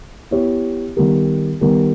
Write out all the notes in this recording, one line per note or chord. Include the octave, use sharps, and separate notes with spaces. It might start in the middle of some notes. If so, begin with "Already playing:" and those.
B3 E4 G4 C#5
D#3 G3 B3 G4 A#4
D#3 G3 B3 G4 A#4